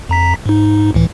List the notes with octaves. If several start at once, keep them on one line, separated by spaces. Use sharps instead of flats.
F2 A#5 B6
G#2 D#4
C#2 A2 E3